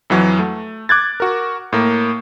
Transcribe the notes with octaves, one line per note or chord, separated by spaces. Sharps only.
F2 E3 F#3
A3
D6 F#6 G#6 A6
F#4 A#4
A2 A#3